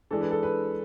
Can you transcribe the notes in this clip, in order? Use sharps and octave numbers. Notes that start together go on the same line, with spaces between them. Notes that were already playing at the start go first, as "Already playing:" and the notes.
E3 G#3 D4 A4
B4
A4
B4